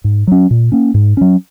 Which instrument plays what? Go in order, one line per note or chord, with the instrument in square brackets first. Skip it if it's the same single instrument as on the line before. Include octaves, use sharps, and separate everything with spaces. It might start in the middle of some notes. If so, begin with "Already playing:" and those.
[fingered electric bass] G#2
F#3 C#4
A#2
A#3 C#4
G#2
F#3 C#4